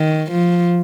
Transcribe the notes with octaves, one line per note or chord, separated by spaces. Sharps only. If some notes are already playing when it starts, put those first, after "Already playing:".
Already playing: D#3
F3